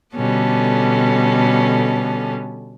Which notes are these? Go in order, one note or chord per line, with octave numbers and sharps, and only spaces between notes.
B2 D3 G3 B3 C#4 A4